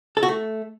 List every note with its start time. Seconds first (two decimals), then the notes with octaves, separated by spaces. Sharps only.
0.17 A4
0.23 F#4
0.28 A3